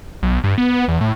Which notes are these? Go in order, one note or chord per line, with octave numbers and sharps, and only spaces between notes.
B1
G2
B3
E2
A2